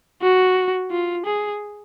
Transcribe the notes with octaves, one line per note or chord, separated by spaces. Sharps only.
F#4
F4
G#4